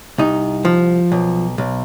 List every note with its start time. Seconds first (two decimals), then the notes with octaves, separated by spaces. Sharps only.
0.18 C2 D#4
0.65 F3
1.12 B1
1.58 B1